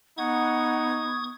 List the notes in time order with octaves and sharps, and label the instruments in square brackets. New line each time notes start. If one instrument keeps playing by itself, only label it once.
[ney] B3 [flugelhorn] D#4 [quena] F#5 [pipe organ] C#6 D#6 G#6